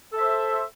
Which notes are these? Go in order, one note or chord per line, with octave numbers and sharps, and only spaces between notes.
A4 C5 E5